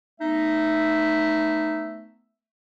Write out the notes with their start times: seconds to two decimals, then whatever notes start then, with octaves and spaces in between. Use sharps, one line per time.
0.21 A3 B3 D#4 E5